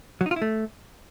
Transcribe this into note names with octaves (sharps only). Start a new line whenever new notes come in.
F#3
D#4
F4
E4
A3